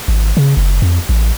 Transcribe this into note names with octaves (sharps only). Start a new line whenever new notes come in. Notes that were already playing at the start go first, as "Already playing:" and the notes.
G#1
C#3
F#1
F2
A1